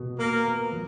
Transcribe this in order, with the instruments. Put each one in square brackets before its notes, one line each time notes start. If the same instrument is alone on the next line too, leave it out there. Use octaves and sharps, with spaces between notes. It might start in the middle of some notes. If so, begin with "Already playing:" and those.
Already playing: [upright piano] B2
[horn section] A#3 A#4 [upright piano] B3
[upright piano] B3
F#3